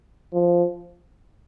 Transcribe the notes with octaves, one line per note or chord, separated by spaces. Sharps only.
F3